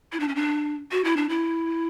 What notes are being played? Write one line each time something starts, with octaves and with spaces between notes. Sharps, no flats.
E4
D4
C#4
D4
F#4
E4
D4
E4